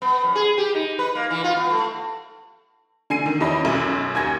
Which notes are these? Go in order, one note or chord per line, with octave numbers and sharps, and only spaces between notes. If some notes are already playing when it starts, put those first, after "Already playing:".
B3
F#2
G#4
G4
D#4
B4
A#3
E3
F4
B3
A3
D3 G#5 C7 D#7
D#3
E2 C#4 D#5 B5
B1 F#2
D#2 G#5 G#6 A#6